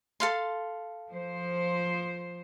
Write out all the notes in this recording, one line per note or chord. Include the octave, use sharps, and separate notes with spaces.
A4 F5 C6
F3 C5